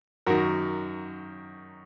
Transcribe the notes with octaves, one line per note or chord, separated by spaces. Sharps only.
F#2 D#3 F#4 A#4